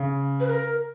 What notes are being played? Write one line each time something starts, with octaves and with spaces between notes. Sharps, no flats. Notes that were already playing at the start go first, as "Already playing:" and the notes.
Already playing: C#3
B4
A#4